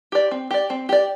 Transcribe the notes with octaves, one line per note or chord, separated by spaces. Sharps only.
G4 D5
C4
G4 D5
C4
G4 D5